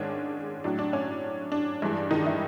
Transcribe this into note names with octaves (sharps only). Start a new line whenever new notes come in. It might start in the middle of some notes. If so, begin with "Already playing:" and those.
Already playing: G#2 D#3 G#3 C#4 D4
A2 F#3 D4
D4
C#4
D4
G2 E3 G#3
D#3 D#4
E3 E4